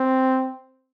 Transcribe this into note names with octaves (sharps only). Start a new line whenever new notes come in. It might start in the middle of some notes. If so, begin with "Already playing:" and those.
Already playing: C4